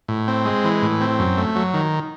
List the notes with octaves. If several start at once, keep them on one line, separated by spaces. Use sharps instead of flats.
A2
C4
G#3
E3
A2
C4
F#2
A3
F#3
D#3